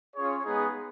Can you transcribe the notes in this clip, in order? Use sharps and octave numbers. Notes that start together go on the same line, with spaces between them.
C#4 F4 G#4 C#5
G#3 B3 D#4 G#4